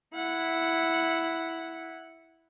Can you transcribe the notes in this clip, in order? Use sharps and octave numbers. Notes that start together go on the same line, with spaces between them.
E4 F#5